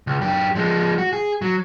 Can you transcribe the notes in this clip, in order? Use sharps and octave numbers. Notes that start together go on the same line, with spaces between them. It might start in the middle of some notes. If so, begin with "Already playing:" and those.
C#2
F#2 G4
F3 G#3
F#4
G#4
F#3